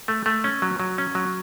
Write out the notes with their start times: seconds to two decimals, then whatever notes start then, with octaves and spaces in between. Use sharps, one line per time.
0.08 A3
0.26 A3
0.44 C#4
0.62 F#3
0.80 F#3
0.98 C#4
1.15 F#3